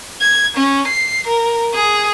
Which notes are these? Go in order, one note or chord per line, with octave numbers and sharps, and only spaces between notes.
G#6
C#4
C7
A#4
G#4